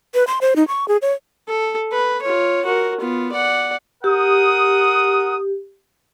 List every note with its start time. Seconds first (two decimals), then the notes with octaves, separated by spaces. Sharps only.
0.14 B4
0.27 C6
0.41 C5
0.56 D#4
0.68 C#6
0.88 G#4
1.02 C#5
1.48 A4
1.92 B4
2.22 F4 C#5
2.65 F#4 A#4
3.01 B3 F4
3.32 D5 F#5
4.04 G4 A#4 F#5 D#6